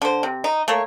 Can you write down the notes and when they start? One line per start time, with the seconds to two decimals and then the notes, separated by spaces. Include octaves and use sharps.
0.02 D3 C5
0.23 C3
0.44 D#4
0.68 A3 A#3 C#5